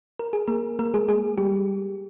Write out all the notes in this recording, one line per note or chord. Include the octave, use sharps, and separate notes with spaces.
A#4
G#4
A#3 A#4
A#3 A#4
G#3 G#4
G#3 G#4
G3 G4